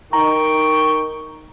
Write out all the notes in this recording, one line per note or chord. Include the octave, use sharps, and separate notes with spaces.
D#4 A#4 G5 A#5 C#6